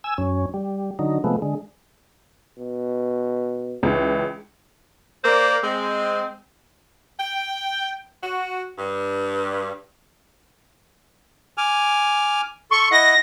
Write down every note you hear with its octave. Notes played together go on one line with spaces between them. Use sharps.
G#5 E6
F#2 C#4
G3
D3 F#3 D#4
C3 F3 G#3 A3 B3
D3 G#3
B2
C#2 E3
A#3 A#4 C5 D5
G#3 C4
G5
F#4
G2
G#5 D6 F6
A4 C6 C#6
E4 D#5 F#5 A#6